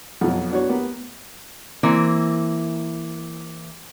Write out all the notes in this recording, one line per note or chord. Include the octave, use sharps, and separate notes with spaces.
F2 B2 F3 F#3
B3 D4 F#4 C#5
A#3 B3 G4
E3 A#3 C4